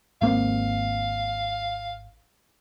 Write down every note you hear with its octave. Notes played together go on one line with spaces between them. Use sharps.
G#1 A#3 C4 F5